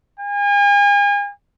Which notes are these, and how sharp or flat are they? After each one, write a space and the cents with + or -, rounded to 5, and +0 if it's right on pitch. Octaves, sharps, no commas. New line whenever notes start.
G#5 -40